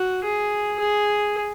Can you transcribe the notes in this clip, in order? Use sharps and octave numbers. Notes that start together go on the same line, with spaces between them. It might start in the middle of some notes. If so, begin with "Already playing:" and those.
Already playing: F#4
G#4
G#4